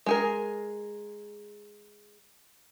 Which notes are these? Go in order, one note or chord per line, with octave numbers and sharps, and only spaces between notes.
G#3 G#4 A#4